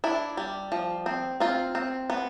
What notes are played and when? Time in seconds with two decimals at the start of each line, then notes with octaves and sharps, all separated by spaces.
0.04 D4 E4
0.37 G3
0.72 F3
1.06 C4
1.40 C4 F4
1.75 C4
2.10 B3